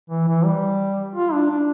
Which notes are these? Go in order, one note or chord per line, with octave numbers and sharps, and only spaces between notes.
E3
E3
G3
F4
D4
D4